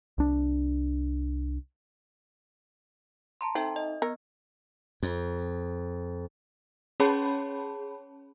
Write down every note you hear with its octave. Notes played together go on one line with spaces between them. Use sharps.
C2 D4
A5 A#5 C6
C4 D#4 A4 E5
D#5
B3 A#4
F2
C#4 G#4 C#5 A5 B5